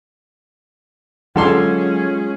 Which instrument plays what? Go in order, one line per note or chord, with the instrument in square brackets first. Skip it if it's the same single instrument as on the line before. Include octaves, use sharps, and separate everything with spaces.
[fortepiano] D3 A4 C6 [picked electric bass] F#3 [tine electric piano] G#3 F4 [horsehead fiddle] C#4 G#4